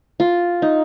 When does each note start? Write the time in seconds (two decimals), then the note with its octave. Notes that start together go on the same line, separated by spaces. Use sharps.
0.20 F4
0.62 D#4